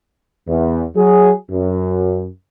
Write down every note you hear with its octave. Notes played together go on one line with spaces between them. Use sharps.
E2
F#3 G#4
F#2